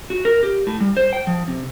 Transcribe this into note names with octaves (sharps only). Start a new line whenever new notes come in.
F#4
A#4
G4
A2
G3
C5
G5
F3
C3